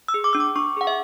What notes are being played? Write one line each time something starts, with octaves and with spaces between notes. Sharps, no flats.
E6
G#4
D6
D4 E6
D6
D4 C#6
G#4 F#5
E5